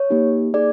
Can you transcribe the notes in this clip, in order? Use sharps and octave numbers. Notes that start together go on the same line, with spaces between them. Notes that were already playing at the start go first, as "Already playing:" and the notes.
Already playing: C#5
A#3 D#4 G4
A#3 D#4 G#4 D5